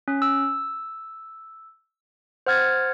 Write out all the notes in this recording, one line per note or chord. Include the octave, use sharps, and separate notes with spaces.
C#4
E6
C5 F#5 F6 G#6 A6